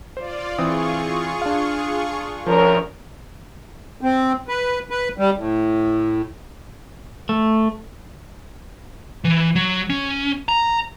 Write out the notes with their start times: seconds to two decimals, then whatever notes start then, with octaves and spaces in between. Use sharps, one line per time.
0.17 F4 C5 D5
0.58 E3 C4 F4 G#4 C#6 D#6
1.42 D4 F5
2.47 D2 F3 C#4 A#4
4.01 C4
4.48 B4
4.90 B4
5.18 G3
5.37 A2
7.29 A3
9.24 E3
9.55 F#3
9.90 C#4
10.49 A#5